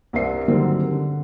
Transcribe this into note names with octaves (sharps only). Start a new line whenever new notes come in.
C2 G2 C4 A#4 E5 C7
D3 D#3 F#3 G3 A#3 C4
D3